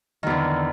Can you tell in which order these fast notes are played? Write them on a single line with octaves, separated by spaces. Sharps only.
D#3 E2 D3